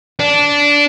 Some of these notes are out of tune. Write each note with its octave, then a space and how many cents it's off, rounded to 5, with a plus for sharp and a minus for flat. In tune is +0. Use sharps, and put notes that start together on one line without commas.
D4 -15